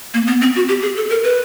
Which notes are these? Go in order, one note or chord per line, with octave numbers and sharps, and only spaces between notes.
A#3
B3
C4
F#4
G4
G#4
A4
A#4
B4